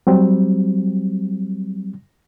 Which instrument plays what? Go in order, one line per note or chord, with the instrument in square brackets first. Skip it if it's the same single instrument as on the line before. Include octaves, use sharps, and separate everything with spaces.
[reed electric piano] F#3 G3 C4